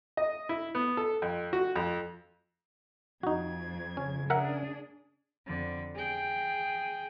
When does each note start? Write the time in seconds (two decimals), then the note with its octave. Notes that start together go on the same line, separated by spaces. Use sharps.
0.17 D#5
0.49 E4
0.75 B3
0.97 A4
1.22 F2
1.53 F#4
1.76 F2
3.23 F2 D#4 F#4 G#6
3.97 C#3 C#4
4.30 D4 G#4 A#4 E5 F#5
5.47 F2 D3
5.95 G#4 G5